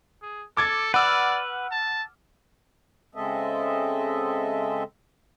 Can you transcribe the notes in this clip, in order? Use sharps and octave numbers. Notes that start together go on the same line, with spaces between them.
G#4
A4 D6 G#6 A6
B4 D5 F#5 E6 F6
A5
C#3 G#3 C4 A4 D#5 E5